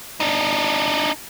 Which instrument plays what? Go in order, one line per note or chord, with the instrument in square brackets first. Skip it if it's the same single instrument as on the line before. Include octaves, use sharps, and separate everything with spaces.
[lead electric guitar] D4 D#4